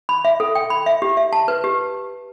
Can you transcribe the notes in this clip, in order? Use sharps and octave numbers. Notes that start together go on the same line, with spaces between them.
B5
E5
A4
G5
B5
E5
G4
E5
A5
B4
G4